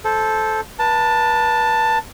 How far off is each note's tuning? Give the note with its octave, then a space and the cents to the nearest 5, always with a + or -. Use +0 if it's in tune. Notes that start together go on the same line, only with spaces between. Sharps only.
A4 -10 C5 +0
B4 -35 A5 +10